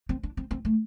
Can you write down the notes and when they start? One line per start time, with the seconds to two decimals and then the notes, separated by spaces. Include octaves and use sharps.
0.09 C4
0.23 D4
0.37 C4
0.51 C4
0.65 A3